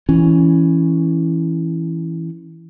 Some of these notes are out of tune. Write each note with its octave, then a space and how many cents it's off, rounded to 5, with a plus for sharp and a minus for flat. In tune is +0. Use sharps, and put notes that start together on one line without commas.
E3 +0 C#4 +0